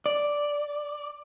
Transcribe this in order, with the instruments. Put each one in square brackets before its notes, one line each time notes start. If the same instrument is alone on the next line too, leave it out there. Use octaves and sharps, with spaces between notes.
[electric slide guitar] D5